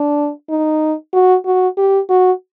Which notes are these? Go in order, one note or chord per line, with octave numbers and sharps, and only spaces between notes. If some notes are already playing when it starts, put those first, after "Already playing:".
Already playing: D4
D#4
F#4
F#4
G4
F#4